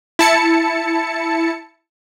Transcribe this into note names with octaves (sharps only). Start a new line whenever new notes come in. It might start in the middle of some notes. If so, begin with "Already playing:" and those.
E4 A5 C#7